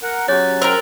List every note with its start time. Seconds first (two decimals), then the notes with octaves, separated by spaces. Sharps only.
0.03 A#4 F#5
0.28 F#3 C#4 G4 G#4 C#5 F#6 A6
0.62 F#4 A#4 C5 G5 A#5 E6